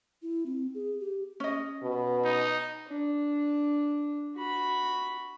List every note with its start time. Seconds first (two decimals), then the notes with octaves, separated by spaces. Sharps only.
0.22 E4
0.46 C4
0.74 G#4
1.00 G4
1.40 C#4 D#5
1.83 B2
2.24 D#4
2.87 D4
4.36 F#4 B5